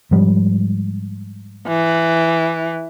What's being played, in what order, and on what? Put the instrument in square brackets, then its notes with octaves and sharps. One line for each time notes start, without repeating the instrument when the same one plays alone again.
[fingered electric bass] G#2 F3 G3
[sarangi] E3